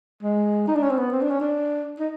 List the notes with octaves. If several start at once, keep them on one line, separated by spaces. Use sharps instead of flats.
G#3
D#4
D4
C#4
C4
B3
C4
D4
C#4
D4
D#4